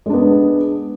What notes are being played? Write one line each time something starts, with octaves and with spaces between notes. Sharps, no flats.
G#3 B3 D4